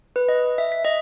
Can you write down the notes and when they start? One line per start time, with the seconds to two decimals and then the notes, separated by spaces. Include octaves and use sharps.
0.16 B4
0.29 D#5
0.58 E5
0.72 B6
0.85 D#5